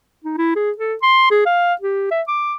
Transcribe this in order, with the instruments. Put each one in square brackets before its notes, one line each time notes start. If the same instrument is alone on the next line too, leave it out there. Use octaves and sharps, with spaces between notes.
[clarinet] D#4
E4
G#4
A4
C6
G#4
F5
G4
E5
D6